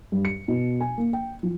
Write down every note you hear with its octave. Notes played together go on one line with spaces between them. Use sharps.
G2
C#7
B2
G#5
A#3
G5
F3